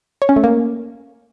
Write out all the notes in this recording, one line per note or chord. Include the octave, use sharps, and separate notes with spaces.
C#5
C#4
A3
A#3